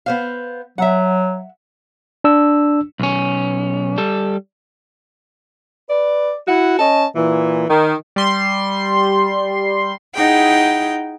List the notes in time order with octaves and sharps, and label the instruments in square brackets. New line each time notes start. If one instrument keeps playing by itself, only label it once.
[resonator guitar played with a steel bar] B3 C5 F5
[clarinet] F#3 [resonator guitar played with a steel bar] E5 F#5
[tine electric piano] D4 E6
[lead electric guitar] B1 C#4
G3 A4
[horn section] B4 D5
E4 F#4 F#5
C#4 D#5 A5
A#2 E3
D#3
[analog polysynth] G3 C6
[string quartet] D#4 E4 G#4 F#5 G5